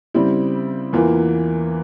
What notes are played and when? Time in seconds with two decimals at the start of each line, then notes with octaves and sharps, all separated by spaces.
0.14 C#3 G3 C4 E4
0.93 E2 E3 A#3 F4